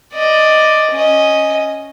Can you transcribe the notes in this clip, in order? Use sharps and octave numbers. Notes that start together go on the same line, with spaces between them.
D5 D#5
C#4 D#5